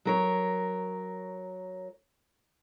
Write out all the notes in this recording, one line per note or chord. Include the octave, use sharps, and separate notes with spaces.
F#3 A#4 C#5